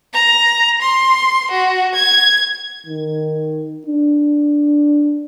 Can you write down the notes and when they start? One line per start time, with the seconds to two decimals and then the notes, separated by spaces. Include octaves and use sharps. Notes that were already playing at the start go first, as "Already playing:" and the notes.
0.13 A#5
0.81 C6
1.51 F#4
1.95 G#6
2.86 D#3
3.86 D4